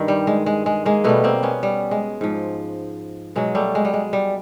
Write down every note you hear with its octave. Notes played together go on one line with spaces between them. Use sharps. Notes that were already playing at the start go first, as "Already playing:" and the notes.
Already playing: G2 D#3
G3
G#3
G#3
G#3
G#3 A#3
B2 G3 A3 B3
A#3 C4
B3 C#4
G3
G#3
G#2 F3
B2 F#3 G#3
G3 A3
G#3
G3
G#3
G3